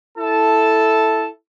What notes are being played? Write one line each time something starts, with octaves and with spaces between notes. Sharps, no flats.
E4 A4 A5